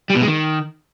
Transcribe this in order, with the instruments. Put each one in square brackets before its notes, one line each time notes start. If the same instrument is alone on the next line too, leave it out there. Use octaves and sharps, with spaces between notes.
[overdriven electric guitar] G3
B2
G#3
D#3